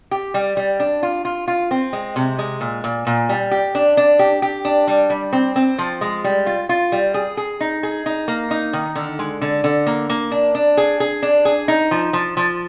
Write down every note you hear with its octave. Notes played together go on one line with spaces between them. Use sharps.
G4
G3
G3
D4
F4
F4
F4
C4
G#3
C3
G#3
A#2
A#2
A#2
G3
G4
D4
D4
G4
G4
D4
G3
G3
C4
C4
F3
G#3
G3
F4
F4
G3
G#4
G#4
D#4
G#4
D#4
A#3
D#4
D#3
D3
G#3
D3
D3
A#3
A#3
D4
D4
G#4
G#4
D4
G#4
D#4
F3
F3
F3